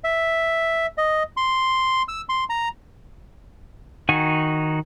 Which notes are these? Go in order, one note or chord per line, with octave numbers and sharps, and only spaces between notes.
E5
D#5
C6
E6
C6
A#5
D#3 D#4 F#4 G#5